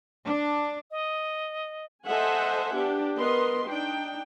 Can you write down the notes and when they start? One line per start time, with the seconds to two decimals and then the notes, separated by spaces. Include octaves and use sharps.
0.25 D4
0.91 D#5
2.06 A4 C5 D#5 E5 F#5 G#5
2.75 B3 D4 G4
3.17 B3 A#4 B4 D#5 C6
3.68 D4 D#4 G5